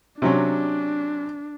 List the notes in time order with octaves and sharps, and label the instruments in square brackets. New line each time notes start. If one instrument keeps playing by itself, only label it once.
[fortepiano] C3 F#3 C#4 [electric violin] D4